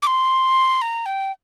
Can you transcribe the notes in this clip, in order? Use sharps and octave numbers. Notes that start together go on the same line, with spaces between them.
D6
C6
A#5
G5